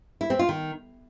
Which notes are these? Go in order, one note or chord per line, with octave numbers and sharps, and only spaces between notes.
E4
C4
F4
D#3